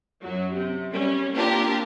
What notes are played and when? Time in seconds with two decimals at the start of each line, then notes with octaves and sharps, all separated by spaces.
0.22 F#2 F#3
0.53 C3
0.92 G3 C#4
1.34 A#3 C4 D4 F4 G4 A#4